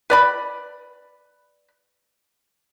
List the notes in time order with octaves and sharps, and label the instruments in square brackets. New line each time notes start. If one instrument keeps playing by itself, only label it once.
[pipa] B4 D5 B5